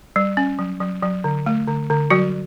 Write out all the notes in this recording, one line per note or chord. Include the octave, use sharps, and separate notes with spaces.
G3
C#4
F#3
F#3
F#3
D3
A3
D3
D3
F#3 G3 F#4